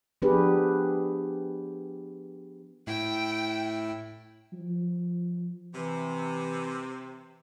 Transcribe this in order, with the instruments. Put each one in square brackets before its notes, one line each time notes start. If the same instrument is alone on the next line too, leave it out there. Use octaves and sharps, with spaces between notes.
[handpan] F3 B3 D4 G4 G#4 B4
[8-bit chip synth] A2 E4 [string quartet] G5
[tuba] F3
[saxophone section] C3 [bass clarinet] E3